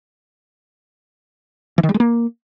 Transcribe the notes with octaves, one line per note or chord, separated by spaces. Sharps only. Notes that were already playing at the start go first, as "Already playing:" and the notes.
E3
D#3
G3
G#3
A#3